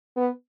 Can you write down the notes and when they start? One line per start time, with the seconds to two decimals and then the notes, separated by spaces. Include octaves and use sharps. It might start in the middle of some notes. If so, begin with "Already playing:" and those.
0.17 B3